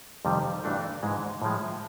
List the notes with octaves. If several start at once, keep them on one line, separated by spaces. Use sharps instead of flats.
F2 C3 D#3 G3
G2 E3 A3 D4 F#4
G#2 E3 G#3
A2 F3 G#3